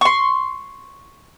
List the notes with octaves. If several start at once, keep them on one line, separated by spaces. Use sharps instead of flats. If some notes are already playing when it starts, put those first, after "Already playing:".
C6 C#6